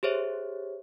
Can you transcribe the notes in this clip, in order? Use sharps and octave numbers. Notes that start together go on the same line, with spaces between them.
G4 G#4 C5 C#5 E5